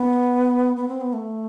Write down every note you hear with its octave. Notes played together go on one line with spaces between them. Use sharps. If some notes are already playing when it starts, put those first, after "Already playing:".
Already playing: B3
B3
C4
B3
A3